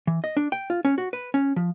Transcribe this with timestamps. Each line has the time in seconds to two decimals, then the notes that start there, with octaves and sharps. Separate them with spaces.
0.07 E3
0.24 D#5
0.37 D4
0.52 G5
0.70 F4
0.85 C#4
0.98 F#4
1.13 B4
1.34 C#4
1.56 F3